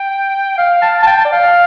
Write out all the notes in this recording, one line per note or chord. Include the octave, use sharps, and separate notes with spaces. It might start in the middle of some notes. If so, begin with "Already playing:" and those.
Already playing: G5
F5
A5
A5
G5
D5
F5